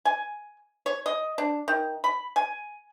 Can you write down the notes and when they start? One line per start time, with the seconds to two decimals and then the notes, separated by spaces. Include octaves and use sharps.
0.05 G#5
0.86 C#5
1.06 D#5
1.38 D4
1.68 D#3
2.04 B5
2.36 G#5